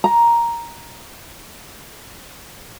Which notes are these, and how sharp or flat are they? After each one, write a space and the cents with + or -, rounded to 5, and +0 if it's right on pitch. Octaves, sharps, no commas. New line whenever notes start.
A#5 +5